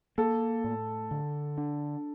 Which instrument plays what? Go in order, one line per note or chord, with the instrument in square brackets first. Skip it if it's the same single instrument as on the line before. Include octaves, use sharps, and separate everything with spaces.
[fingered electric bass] A#3 [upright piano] A4
[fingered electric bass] A2
D3
D4